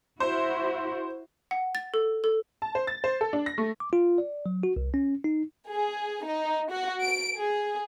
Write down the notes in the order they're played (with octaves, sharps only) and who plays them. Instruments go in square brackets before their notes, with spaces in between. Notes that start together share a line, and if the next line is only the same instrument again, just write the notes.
[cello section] E4 F#4 [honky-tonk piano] C5
[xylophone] F#5
A6
A4
A4
[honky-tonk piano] A5
C5
A6
C5
A4
D4
A#6
A3
[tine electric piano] D6
F4
D5
F#3
F#4
C2
C#4
D#4
[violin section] G#4
D#4
F#4
D7
G#4